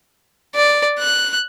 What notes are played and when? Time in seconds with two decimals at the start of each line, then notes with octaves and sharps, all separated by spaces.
0.55 D5
0.98 F#6